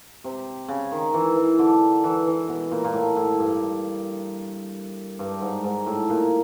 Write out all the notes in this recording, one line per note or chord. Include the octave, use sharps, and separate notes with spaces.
C3
C#3
D#3
E3
E3
D3
E3
E3
B2
A#2
A#2
A2
A2
G2
G2
G#2
G#2
A2
A#2